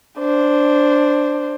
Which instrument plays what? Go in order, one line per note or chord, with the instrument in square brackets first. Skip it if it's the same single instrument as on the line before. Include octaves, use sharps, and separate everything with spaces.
[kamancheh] D4 C5